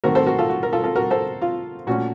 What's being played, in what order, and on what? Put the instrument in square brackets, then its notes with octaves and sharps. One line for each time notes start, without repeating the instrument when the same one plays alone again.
[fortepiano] D#3 A3 C4 F#4 A#4
A4 C5
F#4 A#4
F4 A4
F#4
A#4
F4 A4
F4 A4
F#4 A#4
A4 C5
F4
A#2 A3 C#4 F#4